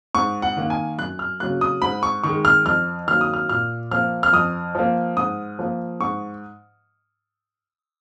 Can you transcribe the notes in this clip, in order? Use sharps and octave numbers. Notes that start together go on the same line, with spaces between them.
G#2 C#6
F#5
D#3 A#3
G#5
F#2 F#6
F6
C#3 F#3 A#3 F#6
D#6
G#2 B5
C#6
D#3 G#3 C#6
F6
F2 F6
D#3 F#3 A#3 F6
D#6
F6
A#2 F6
F3 A#3 F6
F6
F2 D#6
F3 A#3
G#2 D#6
F3 A#3
G#2 C#6